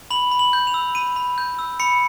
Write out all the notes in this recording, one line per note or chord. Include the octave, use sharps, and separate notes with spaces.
B5 F#7
B5
F#7
G6
F7
E6
B5 D#7
B5
G6
E6
B5 C#7